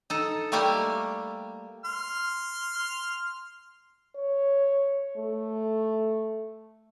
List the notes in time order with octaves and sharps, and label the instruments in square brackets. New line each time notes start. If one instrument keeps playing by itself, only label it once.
[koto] D#4 A4
G3 A3 A#3 G4 D5
[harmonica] C6 F6
[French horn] C#5
A3